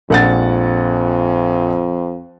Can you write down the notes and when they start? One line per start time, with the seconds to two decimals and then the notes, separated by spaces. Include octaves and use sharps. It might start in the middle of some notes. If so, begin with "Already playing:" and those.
0.10 A#1 F2 F#5 A6